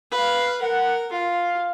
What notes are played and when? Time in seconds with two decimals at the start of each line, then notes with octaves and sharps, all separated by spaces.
0.12 B4 F5
0.62 A#4 F#5
1.12 F4 F5